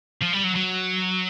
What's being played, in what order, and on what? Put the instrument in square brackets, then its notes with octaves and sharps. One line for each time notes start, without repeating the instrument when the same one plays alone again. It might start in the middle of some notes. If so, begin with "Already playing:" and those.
[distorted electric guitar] F3
G3
F#3
F#3